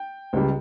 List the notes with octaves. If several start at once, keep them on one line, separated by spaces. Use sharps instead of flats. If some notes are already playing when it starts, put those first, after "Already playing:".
Already playing: G5
C#2 C#3 G3